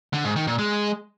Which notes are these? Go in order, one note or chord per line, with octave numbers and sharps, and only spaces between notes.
D3
G#2
D#3
A#2
G#3